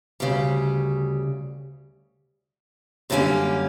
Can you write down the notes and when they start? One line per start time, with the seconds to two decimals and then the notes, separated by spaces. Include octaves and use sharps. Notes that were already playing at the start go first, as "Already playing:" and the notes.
0.20 D2 C#3 G3
3.10 F#2 D3 G3 A#3 C#4